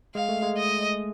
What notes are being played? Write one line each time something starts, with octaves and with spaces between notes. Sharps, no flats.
G#3 F5
A3
G#3
D#5